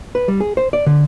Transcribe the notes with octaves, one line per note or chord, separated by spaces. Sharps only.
B4
G3
G#4
C5
D5
D3